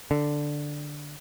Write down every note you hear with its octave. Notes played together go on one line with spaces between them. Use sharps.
D3